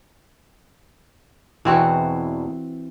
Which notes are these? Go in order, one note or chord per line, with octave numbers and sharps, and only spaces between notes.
E2 B2 E3 C4 F#4